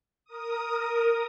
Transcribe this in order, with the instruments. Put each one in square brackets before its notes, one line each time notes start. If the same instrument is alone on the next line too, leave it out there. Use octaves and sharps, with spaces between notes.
[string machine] A#4 D#6